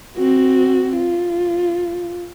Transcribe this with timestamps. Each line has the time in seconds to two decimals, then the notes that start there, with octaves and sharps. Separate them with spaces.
0.17 C4 F#4
0.97 F4